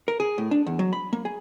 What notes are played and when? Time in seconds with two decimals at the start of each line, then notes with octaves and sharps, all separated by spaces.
0.08 A#4
0.20 G#4
0.38 A2
0.51 D4
0.66 E2
0.79 F#3
0.93 B5
1.13 A#3
1.25 G#4